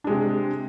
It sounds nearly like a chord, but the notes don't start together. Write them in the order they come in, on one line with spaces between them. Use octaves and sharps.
D4 G#3 C3